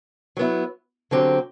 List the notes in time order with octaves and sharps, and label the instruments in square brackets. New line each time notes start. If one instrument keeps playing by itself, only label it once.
[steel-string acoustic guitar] F#3 B3 E4
D3 F#3 C4 G4